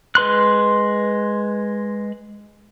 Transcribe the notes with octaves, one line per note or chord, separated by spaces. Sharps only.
G#3 B4 C6 F#6